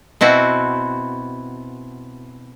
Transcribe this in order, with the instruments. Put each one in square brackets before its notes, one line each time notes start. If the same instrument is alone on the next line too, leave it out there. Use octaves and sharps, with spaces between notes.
[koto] B2 C4 E4 F#4